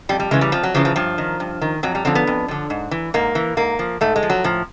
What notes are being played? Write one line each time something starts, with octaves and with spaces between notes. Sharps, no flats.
F2 G3
G3
C#3 E3 G#3
G3
F2 F3
F#3
C#3 E3 F3
F3
G2 F3
D#3
G2
D#3
F2 F#3
G3
D3 F3 C4
B3
F2
D3 F3
G#2
E3
G#2 A#3
E3
G#2 A#3
F3
G#2 A3
G#3
F3
F#3
A2 F3